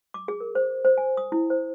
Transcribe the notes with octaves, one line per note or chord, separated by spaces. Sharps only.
D6
G#4
A#4
C5
C5
G#5
D#6
E4
C5